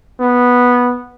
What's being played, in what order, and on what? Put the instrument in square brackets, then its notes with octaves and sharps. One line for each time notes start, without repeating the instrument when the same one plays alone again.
[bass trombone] B3